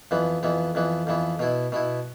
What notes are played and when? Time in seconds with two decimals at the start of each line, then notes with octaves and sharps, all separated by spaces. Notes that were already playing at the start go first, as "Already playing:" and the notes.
0.11 F2 E3 B3
0.43 F2 E3 B3
0.75 F2 E3 B3
1.07 F2 E3 B3
1.39 B2 B3 E4
1.72 B2 B3 E4